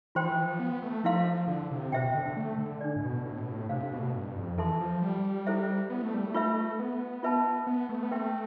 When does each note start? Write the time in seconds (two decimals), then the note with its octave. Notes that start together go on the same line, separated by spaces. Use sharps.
0.15 E3 F4 C5 G5 C6
0.26 F3
0.30 E3
0.45 F3
0.59 B3
0.82 A3
1.04 F3 E4 B4 F5 C6
1.48 D3
1.71 C3
1.92 B2 C5 E5 G5
2.04 B2
2.14 D3
2.26 D3
2.37 A3
2.58 D3
2.81 D4 A4 D5
2.96 A2
3.03 B2
3.25 A2
3.39 B2
3.51 A2
3.69 C3 D4 A4 C5 F5
3.92 B2
3.99 A2
4.05 B2
4.14 G2
4.36 F2
4.58 E3 A4 E5 A5 C6
4.80 F3
5.02 G3
5.47 E4 A4 C5 E5
5.90 B3
6.03 A3
6.14 G3
6.26 A3
6.34 F4 B4 E5
6.79 B3
7.23 F4 B4 E5 A5
7.67 B3
7.89 A3
8.03 B3
8.11 A3 B4 E5 G5 C6